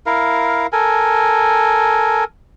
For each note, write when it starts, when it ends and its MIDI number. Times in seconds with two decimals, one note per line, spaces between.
0.06 0.67 64
0.06 0.67 70
0.06 0.67 77
0.73 2.24 69
0.73 2.24 70
0.73 2.24 80